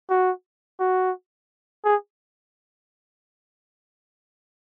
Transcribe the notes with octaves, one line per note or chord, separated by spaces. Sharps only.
F#4
F#4
G#4